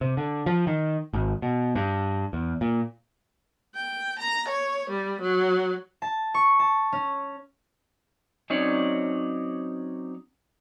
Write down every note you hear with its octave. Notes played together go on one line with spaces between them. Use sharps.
C3
D3
F3
D#3
G#1
B2
G2
E2
A#2
G5
A#5
C#5
G3
F#3
A5
C#6
A5
C#4
F#3 C4 C#4 D#4 C#5 D5